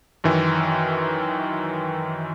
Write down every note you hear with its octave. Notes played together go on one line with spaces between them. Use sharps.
F#2 D#3 E3